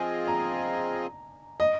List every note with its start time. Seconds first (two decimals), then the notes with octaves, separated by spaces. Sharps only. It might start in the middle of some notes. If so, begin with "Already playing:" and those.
Already playing: F3 C4 F4 G#4 D#5 G#5
0.28 A#5
1.60 D#5